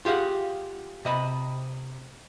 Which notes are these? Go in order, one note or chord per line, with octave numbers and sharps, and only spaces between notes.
F4 G4 G#4 F5 F#5
C3 D#5 B5